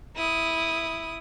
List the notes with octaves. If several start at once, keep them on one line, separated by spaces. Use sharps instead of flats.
E4 D#6